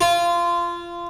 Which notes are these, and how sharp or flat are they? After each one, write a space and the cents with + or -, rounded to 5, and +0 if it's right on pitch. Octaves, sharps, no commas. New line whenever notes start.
F4 -20